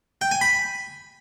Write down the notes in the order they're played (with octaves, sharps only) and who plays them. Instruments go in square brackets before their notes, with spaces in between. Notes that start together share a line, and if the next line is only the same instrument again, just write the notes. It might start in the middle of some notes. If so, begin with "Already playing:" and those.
[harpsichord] G5
G#5
B5